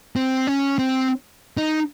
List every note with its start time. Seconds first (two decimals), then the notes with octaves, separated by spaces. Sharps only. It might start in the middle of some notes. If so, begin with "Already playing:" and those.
0.16 C4
0.47 C#4
0.78 C4
1.57 D#4